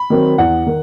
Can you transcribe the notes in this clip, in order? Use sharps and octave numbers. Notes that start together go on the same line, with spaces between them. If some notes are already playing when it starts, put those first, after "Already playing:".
Already playing: B5
D#3 F#3 C4
E2 F#5
D#3